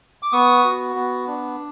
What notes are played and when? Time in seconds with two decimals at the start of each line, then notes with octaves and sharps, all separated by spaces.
0.23 D6
0.32 B3 C#6 D#6
0.64 F#4
0.96 B3
1.27 D4